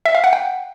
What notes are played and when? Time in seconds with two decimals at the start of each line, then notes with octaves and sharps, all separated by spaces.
0.05 E5
0.15 F5
0.24 F#5
0.33 G5